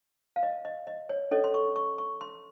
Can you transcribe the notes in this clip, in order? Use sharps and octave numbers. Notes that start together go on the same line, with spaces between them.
F5
D#5
D#5
D#5
C#5
C#4 A4 C#5 D#5
C6
C#6
C#6
C#6
C6